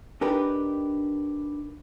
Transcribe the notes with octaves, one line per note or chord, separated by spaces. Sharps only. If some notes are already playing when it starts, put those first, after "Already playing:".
D4 D#4 G4 A#4 B4